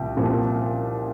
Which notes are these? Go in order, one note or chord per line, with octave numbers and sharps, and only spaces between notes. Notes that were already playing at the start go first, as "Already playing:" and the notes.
Already playing: C2 A#2 F3 G5
C2 A#2 F3